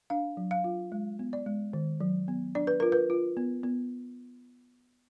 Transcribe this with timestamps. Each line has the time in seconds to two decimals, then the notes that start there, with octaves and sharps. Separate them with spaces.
0.10 D4 F5
0.37 F#3
0.51 F5
0.64 F4
0.92 G#3
1.19 B3
1.33 D5
1.46 G#3
1.73 D#3
2.00 F#3
2.28 B3
2.55 D4 D5
2.67 B4
2.80 F4 A#4
2.92 B4
3.10 F4
3.37 B3
3.64 B3